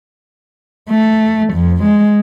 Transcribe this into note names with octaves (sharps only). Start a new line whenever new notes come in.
A3
F2
G#3